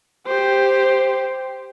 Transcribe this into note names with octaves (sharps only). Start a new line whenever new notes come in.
G4 C5